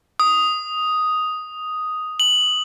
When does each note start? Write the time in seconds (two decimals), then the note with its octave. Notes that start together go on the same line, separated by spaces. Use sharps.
0.20 D#6
2.20 F#7